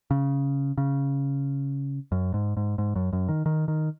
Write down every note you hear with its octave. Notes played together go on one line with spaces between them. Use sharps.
C#3
C#3
F#2
G#2
G#2
G#2
F#2
F#2
D#3
D#3
D#3